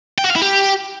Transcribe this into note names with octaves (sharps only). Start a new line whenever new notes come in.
G5
F#4
F5
E4
G4